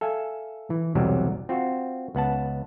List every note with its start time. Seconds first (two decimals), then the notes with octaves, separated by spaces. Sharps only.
0.01 A4 E5 F5 G#5
0.70 E3
0.95 B1 E2 C3 F#3 G3
1.49 C4 F4 F#4
2.15 C#2 B3 F#5 A5